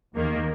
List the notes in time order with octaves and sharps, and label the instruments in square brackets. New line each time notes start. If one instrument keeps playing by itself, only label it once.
[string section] D#2 D#3 A#3